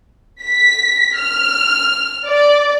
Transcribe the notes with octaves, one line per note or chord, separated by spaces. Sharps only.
B6
F6
D5